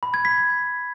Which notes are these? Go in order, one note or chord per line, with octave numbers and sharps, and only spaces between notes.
B5
G#6
B6